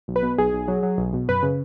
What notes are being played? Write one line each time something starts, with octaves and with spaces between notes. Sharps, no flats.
B1
B4
B2
B1 G#4
B1
F#3
F#3
B1
B2
F#2 B4
C#3